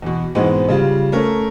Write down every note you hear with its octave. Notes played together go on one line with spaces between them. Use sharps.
E2 B2
G#2 B2 E3 G#3 B3 C4
C#3 G3 F4
A3 C#4 A#4